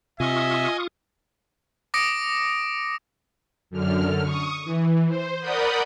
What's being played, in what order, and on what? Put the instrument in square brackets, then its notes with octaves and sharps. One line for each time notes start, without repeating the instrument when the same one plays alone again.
[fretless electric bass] C3 [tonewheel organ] F4 C#6 D#6 [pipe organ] D#5 G#5 [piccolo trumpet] E5
[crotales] D6 D#6 A#6 C#7 D7
[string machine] F#2 D3 F6
C#6 D#6
E3
C5
A#4 D5 F#5 B5 D#6 G6